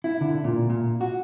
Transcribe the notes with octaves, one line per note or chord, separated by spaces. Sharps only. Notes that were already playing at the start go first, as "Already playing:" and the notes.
E4
D3
A#2
A#2
F#4